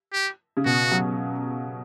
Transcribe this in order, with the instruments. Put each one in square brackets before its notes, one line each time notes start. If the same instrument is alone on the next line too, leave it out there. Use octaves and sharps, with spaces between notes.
[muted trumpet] G4
[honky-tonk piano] C#3
[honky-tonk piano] B2 [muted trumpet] F#4
[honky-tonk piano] F#3